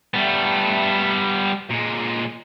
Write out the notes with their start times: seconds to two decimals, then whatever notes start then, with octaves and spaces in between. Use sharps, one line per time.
0.14 G3 B3 E5 A5
1.71 A#2 G#3